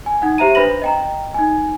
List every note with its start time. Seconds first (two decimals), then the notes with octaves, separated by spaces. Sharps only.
0.06 G#5
0.22 D#4 F#5
0.38 G4 C5 E5 A#5 D#7
0.55 D4 B4 C5 B5 A#6 F#7
0.82 D#5 G5 A#5
1.34 D#4 G#5